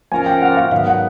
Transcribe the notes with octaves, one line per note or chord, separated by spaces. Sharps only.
F3 A#3 C#4 F4 A#4 G#5
G5
F#5
F5
G#2 D#3 F#3 B3 F5
F#5